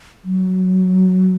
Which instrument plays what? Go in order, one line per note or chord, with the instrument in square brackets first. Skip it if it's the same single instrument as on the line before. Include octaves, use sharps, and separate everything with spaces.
[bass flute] F#3